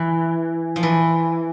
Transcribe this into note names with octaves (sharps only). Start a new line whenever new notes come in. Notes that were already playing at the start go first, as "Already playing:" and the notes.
Already playing: E3
F3
E3